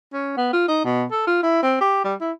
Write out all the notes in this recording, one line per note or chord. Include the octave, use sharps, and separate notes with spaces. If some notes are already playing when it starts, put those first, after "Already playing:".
C#4
B3
F4
D#4
B2
A4
F4
E4
C4
G4
G3
E4